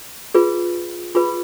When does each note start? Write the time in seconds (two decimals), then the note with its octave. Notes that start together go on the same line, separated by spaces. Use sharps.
0.34 F4 G#4 B4
1.15 F4 G#4 B4 B5